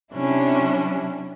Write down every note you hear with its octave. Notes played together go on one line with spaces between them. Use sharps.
C3 F#3 C#4 D4 E4